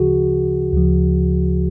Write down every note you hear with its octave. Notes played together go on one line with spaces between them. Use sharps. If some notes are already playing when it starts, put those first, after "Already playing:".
Already playing: D2 C#3 F3 F#4 G#4
D2 C#3 F3